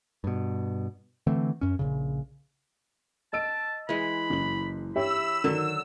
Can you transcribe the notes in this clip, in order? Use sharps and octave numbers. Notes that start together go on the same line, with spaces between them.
G2 B2
D3 E3 A3 C4
F#2 C#4
A#1 A2 C#3
D#5 A5 E6 D7
E3 G#3 B5
F#1 F#7
G4 C#5 E5 B5 E6
D3 D#3 F#3